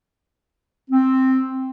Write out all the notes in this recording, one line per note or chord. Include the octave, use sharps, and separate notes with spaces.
C4